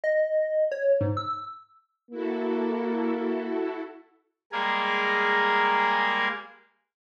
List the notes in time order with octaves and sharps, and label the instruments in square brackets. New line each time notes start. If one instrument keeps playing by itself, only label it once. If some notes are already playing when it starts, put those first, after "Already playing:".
[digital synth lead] D#5
C#5
G#2
E6
[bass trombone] A#3 [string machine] E4 F#4 A4
[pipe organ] G3 G#3 A#3 G#4 A#4 G#5